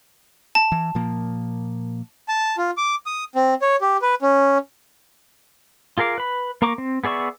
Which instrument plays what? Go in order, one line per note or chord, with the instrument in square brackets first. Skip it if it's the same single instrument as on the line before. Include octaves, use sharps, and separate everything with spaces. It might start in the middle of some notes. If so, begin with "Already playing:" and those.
[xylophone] A5
[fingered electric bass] E3
A#2 F3 A#3
[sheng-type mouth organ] A5
F4
D6
D#6
C4
C#5
G4
B4
C#4
[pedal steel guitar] F4 G#4 A#4 F5 D6
B4 B5
A#3 A#4 A#5 C#6 D6
C4
B3 G#4 D5 E5 C#6